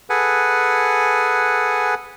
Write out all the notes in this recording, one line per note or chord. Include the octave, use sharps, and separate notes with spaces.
G#4 A4 B4 F#5 G#5